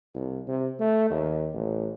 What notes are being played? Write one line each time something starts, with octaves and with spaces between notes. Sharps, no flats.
C2
C3
A3
D#2
A1